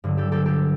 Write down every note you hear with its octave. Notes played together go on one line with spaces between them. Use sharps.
G2 D3 F#3
G4 A4
G4 A4
G4 A4